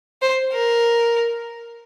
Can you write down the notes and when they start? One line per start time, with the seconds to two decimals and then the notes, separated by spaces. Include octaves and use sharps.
0.22 C5
0.53 A#4